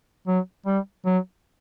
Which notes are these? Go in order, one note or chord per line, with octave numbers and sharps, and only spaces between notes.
F#3
G3
F#3